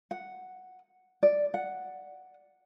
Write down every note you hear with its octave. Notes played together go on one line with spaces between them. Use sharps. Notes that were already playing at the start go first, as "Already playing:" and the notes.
F#5
D5
F#5